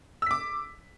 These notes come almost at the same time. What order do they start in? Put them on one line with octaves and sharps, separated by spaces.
E6 B6 D6